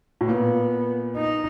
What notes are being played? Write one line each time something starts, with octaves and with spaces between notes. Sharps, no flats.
A2
A#2 B3
D#4